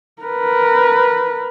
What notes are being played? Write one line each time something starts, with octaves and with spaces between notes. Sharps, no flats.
A#4 B4